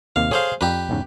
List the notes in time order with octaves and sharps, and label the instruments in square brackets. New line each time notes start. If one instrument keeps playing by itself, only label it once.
[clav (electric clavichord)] D#2 C3 A#3 [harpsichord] F5
[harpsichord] G#4 C5 F5 [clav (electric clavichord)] A4 C#5
[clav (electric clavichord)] F2 D5 A#5 [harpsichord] G4 B4
[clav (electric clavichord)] E2 G#2 C#3